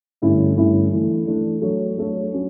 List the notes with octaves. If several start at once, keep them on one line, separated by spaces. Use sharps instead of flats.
G2 D3 A3 C#4 E4
G2 D3 A3 C#4 E4
E3 A3 D4
E3 A3 D4
F#3 A3 D4 A4 C#5
F#3 A3 D4 A4 C#5
F#3 C#4